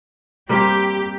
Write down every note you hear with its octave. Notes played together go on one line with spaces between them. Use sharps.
G3 A#3 C4 G4